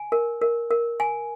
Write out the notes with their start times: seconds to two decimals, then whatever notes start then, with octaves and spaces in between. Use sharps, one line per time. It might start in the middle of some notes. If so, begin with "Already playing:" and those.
Already playing: G#5
0.12 A#4
0.41 A#4
0.71 A#4
1.00 G#5